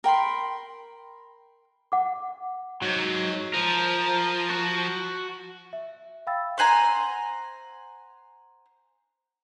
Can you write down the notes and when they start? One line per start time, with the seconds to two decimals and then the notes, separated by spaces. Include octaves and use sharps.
0.04 A#4 G5 B5 C6
1.92 F#5 D6
2.82 G#2 F#3
3.54 F3 A#4
4.50 F#4
5.73 E5
6.27 F5 G5 B5 E6 A6
6.58 C5 F#5 G#5 A#5